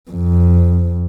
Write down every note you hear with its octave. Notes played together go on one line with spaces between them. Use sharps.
F2